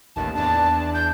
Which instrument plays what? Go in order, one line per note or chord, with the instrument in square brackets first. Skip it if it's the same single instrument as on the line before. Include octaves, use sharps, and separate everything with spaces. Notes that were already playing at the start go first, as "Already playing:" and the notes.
[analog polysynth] A1 D#2 [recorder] A5
[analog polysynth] E2 D4 [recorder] A5
[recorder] G6